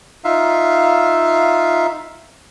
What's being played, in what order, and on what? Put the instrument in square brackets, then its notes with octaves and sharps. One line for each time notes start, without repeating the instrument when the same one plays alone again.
[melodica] D#4 F4 E5 F5